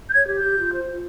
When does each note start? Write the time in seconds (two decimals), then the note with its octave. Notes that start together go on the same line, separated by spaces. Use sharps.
0.10 G6
0.13 C#5 G#6
0.28 G4
0.36 G6
0.44 G4
0.58 F4
0.73 C5
0.88 F4